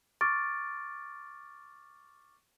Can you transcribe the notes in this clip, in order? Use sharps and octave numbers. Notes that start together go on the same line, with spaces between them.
C#6 D6 F6 A6 D7